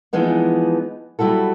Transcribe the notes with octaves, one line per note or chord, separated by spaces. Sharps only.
E3 F3 G#3 B3 D#4
F#3 G3 E4 F#4 A4